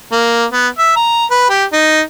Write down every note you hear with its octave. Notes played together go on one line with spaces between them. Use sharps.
A#3
B3
E5
A#5
B4
G4
D#4